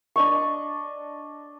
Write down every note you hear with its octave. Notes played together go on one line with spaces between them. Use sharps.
D4 D#5 C#6